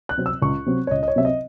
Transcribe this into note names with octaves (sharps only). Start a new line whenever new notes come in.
F#6
C3 F#3 C4
E6
C#2 C#6
C3 F#3 C4
C#5
C#2 D#5
D#5
C#5
C3 F#3 C4 E5
D#5